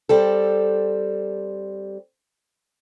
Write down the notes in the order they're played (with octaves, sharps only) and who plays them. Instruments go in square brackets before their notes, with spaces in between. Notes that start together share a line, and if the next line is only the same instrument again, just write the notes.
[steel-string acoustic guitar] G3 C4 A4